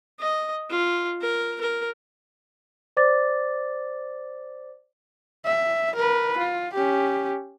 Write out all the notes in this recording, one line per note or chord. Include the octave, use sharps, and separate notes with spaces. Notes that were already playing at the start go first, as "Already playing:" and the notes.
D#5
F4
A#4
A#4
C5 D5 D6 A6
E5
A#4 B4
F4
C#4 G4